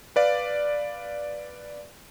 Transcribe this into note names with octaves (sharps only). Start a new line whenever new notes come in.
B4 D5 F5